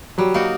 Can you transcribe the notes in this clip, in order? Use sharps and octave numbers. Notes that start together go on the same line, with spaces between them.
F#3 G3
A#3 D#4 F#4